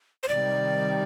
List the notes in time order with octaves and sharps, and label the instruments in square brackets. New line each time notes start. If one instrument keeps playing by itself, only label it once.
[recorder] C5
[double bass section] C3 D#3 G3 [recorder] D5